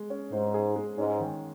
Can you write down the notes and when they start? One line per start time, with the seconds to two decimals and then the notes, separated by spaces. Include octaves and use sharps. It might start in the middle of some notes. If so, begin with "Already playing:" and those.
Already playing: G#3
0.10 C#4
0.32 G#2 C5
0.54 G#4
0.76 G#3
0.98 G#2 C#4
1.20 D#3